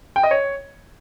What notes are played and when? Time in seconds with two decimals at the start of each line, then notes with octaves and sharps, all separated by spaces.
0.16 G5
0.23 D#5
0.31 C#5